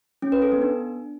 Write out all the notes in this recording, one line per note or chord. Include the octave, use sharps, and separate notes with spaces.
C#4
B4
A4
B3
D4